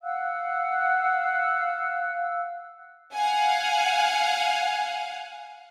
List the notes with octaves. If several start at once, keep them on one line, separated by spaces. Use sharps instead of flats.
F5 F#5 E6 F#6
F5 F#5 G#5